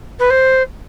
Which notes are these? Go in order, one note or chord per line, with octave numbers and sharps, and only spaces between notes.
B4
C5